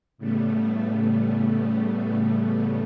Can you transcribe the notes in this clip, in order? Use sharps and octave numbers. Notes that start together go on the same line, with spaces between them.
A2 C#3 G3 A3 B3